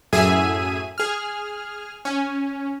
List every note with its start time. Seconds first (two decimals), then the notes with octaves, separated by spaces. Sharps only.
0.13 F#2 A2 G#4 E5 G#5 D#7
0.98 G#4 F6
2.05 C#4